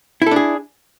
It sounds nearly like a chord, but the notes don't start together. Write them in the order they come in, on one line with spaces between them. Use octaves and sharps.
E4 A4 D4 G#4